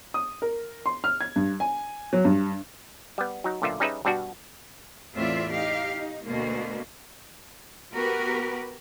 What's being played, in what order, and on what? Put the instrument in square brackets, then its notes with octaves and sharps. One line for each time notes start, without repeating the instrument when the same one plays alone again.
[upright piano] D#6
A#4
C6
F6
G#6
G2
G#5
F#3
G2
[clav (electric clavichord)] G3 B3
F#3 D#4
B1 A#2 D3 F4 E5
G3 C#4 D#4 G#4 B4 E5
G2 B2 G3 D4 F#4
[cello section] E2 A2 C4 F4 D5 E5
D#4 G4 F5
D#4
D2 B2 A#3
B3 F#4 G4 A#4 B4